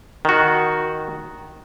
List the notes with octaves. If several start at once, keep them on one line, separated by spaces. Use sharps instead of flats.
D#3 F#4